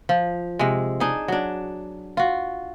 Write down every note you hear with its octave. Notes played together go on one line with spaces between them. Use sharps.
F3
C3 G#3
D4 D#4 G#4
F#3 D4
F4 F#4